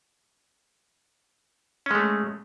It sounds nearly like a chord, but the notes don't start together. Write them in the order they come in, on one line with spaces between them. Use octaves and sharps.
C#4 G#3 A3